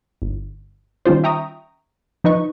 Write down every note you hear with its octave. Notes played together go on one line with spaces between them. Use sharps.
G1
D#3 G3 C#4 F4 C5
E5 G5 A#5 C#6 D#6
F3 D#4 B4 D#5 C#6